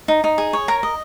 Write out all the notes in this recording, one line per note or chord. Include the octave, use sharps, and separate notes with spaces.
D#4
D#4
G#4
C#5
A#4 A#5
D#5